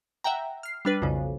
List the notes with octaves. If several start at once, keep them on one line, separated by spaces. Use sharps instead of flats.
E5 F#5 G5 A#5
F6 C7
G3 D4 B4
B1 F2 C#3